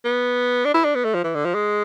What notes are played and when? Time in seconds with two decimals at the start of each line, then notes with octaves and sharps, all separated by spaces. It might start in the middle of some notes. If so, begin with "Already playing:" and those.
0.05 B3
0.65 D4
0.74 E4
0.84 D4
0.95 B3
1.04 A3
1.14 F3
1.24 E3
1.35 D3
1.45 F3
1.54 G#3